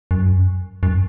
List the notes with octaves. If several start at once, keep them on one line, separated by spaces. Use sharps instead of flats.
F#2
F#2